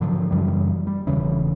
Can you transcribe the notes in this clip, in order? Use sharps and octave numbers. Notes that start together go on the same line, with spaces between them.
G#2 D3 F3 F#3
F#2 C#3 E3 G3
G3
E1 C#3 E3